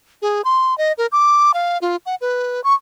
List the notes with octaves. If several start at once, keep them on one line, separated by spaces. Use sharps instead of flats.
G#4
C6
D#5
A#4
D6
F5
F4
F#5
B4
C#6